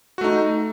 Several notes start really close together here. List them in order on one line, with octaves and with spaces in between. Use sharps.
F#4 A3 D#4